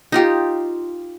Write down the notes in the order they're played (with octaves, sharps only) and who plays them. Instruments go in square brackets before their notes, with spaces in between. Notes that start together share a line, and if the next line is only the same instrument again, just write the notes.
[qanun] D#4 F4 G4